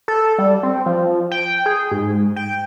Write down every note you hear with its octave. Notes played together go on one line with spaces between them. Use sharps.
A4
G3
C4
F3
G5
G#4
G#2
G5